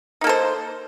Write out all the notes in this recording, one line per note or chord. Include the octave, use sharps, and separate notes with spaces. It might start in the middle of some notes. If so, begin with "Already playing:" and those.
A#3 D#4 A4 C5